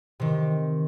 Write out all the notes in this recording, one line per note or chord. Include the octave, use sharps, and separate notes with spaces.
C3 D#3